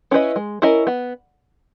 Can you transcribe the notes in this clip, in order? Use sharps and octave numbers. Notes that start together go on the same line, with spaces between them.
C#4 E4 B4 D#5
G#3
C#4 E4 A#4 D#5
B3